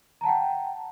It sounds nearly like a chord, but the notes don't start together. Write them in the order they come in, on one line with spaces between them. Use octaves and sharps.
A#5 A5 F#5 G5